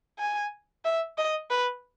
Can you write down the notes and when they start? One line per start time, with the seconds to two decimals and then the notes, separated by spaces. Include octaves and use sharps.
0.19 G#5
0.85 E5
1.18 D#5
1.51 B4